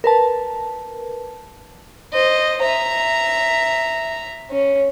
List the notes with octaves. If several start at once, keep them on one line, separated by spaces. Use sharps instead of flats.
A#4 B4 A5
C5 D#5
E5 A#5
C#4